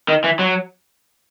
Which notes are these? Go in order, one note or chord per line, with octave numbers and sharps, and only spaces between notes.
D#3
E3
F#3